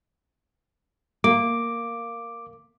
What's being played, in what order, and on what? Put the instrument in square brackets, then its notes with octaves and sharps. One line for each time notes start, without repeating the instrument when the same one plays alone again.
[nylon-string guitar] A#3 [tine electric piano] D6